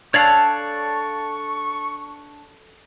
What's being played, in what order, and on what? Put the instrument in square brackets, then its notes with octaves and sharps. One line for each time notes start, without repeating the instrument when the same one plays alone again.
[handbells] D4 A5 F#6 [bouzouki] A4 [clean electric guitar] C#5 D5 F5 [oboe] C#6